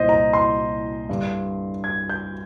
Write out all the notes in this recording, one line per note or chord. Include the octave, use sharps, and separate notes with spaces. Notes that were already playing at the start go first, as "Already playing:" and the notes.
Already playing: C2 A#2 C5 D#5
A#5
C6
G2 D3
G#6
G6